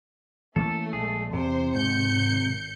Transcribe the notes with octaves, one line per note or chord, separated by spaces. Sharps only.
E3 A3 A#3 C#4 A4
A#1 G#3 G#4
E2 C3 C5
G#1 G#2 G6 C#7